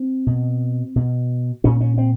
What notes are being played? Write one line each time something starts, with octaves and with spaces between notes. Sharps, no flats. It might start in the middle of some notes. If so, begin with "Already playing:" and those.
Already playing: C4
B2
B2
A#2 C#4
C#4
C4